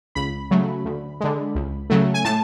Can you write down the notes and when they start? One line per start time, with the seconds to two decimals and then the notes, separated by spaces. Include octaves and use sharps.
0.15 C#2 B5
0.51 C#3 F#3 A3
0.85 D2
1.21 D3 G#3
1.55 C#2
1.90 C#3 F#3 A3
2.14 G#5
2.25 A2 A5